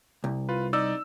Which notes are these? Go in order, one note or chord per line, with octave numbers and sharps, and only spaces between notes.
C2
F4 B4
D#4 D5 E6